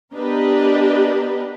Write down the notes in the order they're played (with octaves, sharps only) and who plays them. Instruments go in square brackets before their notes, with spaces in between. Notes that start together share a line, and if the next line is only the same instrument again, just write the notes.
[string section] B3 D4 G4 A#4 B4 D#5